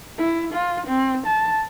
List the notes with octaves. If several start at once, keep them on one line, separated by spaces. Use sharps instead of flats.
E4
F4
C4
A5